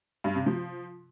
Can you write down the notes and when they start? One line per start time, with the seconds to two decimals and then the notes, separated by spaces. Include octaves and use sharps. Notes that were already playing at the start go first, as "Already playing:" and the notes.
0.24 G2
0.35 C3
0.46 F3